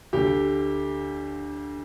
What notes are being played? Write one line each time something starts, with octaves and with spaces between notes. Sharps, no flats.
D2 D3 G4